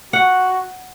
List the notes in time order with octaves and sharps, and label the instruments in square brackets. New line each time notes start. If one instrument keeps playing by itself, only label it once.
[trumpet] F#4 [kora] F#5